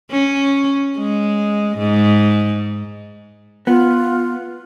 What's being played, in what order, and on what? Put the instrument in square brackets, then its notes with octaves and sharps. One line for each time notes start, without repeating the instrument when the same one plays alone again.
[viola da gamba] C#4
G#3
G#2
[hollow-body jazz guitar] B3 [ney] F4